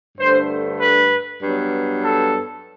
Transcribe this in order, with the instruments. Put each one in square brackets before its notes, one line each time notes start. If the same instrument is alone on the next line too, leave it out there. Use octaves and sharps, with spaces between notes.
[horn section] G2 D3 A3 C5
B4
G2 F#3 B3
A4